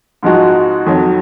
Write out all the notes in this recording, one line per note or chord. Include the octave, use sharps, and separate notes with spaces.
G#2 F3 G#3 D#4 F#4
F2 D#3 F#3